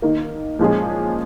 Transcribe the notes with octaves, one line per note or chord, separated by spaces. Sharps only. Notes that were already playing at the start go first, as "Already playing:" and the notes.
D#3 A#3 D#4
A#2 F3 G#3 C#4 G#4